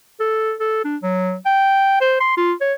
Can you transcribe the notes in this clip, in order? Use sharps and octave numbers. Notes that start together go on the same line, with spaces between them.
A4
A4
D4
F#3
G5
C5
C6
F4
C#5